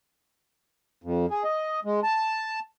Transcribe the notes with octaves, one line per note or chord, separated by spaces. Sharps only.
F2
G#4
D#5
G#3
A5